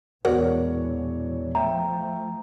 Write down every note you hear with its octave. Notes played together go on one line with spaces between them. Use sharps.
E1 A#2 E3 F#4 A#4 C#5 D5 F#5
F3 A3 E5 G5 A#5